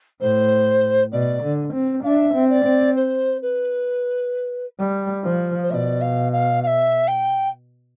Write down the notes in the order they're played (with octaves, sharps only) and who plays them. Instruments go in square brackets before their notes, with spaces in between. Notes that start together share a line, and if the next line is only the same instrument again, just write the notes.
[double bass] A2 [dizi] C5
[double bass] B2 [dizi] D5
[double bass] D3
C4
[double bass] D4 [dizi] E5 F5
[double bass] C4
[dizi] D5
[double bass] C4
[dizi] C5
B4
[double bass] G3
F3
[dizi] C5
[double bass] B2 [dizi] D5 E5
[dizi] F5
F5
F5
E5
G5